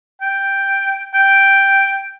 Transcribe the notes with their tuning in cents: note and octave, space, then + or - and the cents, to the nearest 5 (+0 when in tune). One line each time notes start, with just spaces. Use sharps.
G5 +0
G5 +0